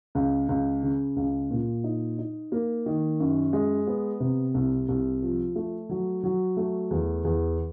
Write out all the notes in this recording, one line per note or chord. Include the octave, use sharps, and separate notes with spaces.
C#2
C#2
C#3
C#2
A#2
D#4
D#4
A#3
D#3
F#2
G#3
B3
C3
C2
C2
F3
A3
F#3
F#3
A3
E2
E2